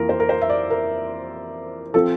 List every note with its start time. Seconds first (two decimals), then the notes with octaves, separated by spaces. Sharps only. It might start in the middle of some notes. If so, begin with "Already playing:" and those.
Already playing: F2 E3 A#3 A#4
0.09 C5
0.20 A#4
0.29 C5
0.41 E5
0.49 D5
0.70 A#4
1.94 F3 C4 A4